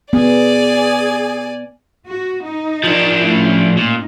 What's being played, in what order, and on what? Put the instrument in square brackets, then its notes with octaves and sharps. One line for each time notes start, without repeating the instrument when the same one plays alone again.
[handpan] B3 [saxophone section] G#4 [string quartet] D5 G#5
[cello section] F#4
D#4
[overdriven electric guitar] F3 D4
[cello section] A2 C#4 E4
[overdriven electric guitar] A#2 [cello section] D#4